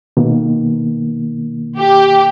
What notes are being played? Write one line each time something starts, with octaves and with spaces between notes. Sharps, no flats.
B2 D#3 A#3
G4